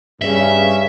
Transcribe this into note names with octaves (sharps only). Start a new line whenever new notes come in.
G2 C#3 C#4 E5